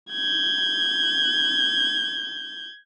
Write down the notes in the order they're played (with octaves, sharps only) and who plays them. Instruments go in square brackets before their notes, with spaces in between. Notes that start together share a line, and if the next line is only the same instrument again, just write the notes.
[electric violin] G6 G#6